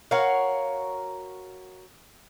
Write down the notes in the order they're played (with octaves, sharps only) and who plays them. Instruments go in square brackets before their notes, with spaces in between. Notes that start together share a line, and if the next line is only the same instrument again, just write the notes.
[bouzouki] F#4 A#4 C#5 F5